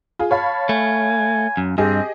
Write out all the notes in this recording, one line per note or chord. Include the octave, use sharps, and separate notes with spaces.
F4 G#4
C#5 F5 A5 B5
A3 G#5
F#2
G2 C4 G4 G#4 D#5